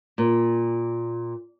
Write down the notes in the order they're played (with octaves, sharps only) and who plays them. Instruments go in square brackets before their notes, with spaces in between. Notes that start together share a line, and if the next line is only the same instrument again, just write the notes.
[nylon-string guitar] A#2